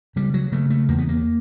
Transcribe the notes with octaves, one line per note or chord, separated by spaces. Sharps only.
C#3 G3
F#3
C#3 A3
A3
E2 A#3
B3
A#3